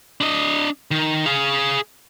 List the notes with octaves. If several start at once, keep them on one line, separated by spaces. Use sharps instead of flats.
D4 D#5
D#3
G#4 F5